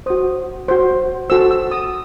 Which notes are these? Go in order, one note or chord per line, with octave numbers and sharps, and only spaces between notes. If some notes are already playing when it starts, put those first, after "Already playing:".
F#4 C5 D#6
F#4 C5
F#4 A4 C5 E6
E6
D#6